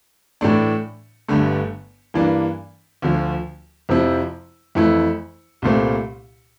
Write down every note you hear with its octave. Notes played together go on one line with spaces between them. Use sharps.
A2 E3 A3 D4
G1 G2 D3 A3
G2 E3 A#3 D4
D2 D3 F3
F2 C3 F3 C4 E4
F2 E3 A3 E4
C2 A#2 A3 C4